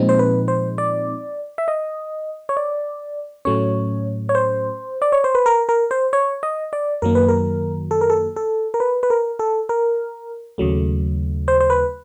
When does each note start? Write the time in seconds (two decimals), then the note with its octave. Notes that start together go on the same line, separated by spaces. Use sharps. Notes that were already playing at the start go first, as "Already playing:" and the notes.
Already playing: A#2 F3 G#3 C4 D#4
0.09 C5
0.19 B4
0.48 C5
0.78 D5
1.58 E5
1.68 D#5
2.49 C#5
2.57 D5
3.45 A2 F#3 A3 C#4 C#5
4.29 C#5
4.35 C5
5.02 D5
5.12 C#5
5.24 C5
5.35 B4
5.46 A#4
5.69 A#4
5.91 C5
6.13 C#5
6.43 D#5
6.73 D5
7.02 F#2 D#3 F#3 A#3 A#4
7.15 B4
7.28 A#4
7.91 A4
8.01 A#4
8.10 A4
8.36 A4
8.74 A#4
8.80 B4
9.03 B4
9.10 A#4
9.39 A4
9.69 A#4
10.58 D#2 C#3 F#3 A3
11.48 C5
11.60 C5
11.70 B4